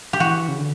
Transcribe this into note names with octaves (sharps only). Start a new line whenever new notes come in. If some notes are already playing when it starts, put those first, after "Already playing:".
G4
E3 F#4
C#3
D3